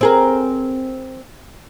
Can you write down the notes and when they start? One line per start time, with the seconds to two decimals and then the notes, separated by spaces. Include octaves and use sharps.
0.01 C4 G#4 A#4